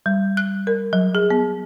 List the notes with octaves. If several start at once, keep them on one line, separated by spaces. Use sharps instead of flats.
G3
F#6
A#4
F#3
G#4
B3